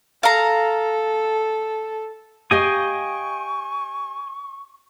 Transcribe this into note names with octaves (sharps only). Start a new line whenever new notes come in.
A4 F5 A#5
G4 D#5 F5 G5 G#5 C#6 D#6